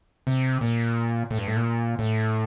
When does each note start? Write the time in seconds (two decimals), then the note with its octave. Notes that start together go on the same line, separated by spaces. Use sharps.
0.27 C3
0.61 A#2
1.31 A2
1.38 G2
1.47 A2
1.56 A#2
1.99 A2